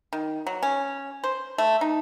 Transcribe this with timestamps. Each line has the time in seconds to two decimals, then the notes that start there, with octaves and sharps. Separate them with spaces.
0.13 D#3
0.47 F#3
0.63 C#4
1.24 C5
1.58 A3
1.81 D#4